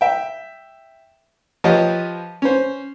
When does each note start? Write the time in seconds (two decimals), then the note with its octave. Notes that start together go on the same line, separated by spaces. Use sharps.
0.01 E5 G5
1.64 F3 G4 B4 C#5 D#5
2.42 C#4 C5